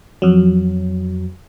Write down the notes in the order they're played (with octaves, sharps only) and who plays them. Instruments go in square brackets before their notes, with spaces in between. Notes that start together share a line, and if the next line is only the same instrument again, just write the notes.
[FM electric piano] F2 F#3